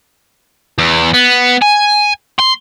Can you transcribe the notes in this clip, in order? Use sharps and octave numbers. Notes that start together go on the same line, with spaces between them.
E2
B3
G#5
C6